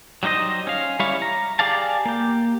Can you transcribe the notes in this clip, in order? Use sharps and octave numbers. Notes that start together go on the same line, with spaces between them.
F#3 G3 D#4 C5 D#5
C#4 F5
G3 E4 C#5 F5
A#5
G4 G#4 D5 F5 A5
A#3 G4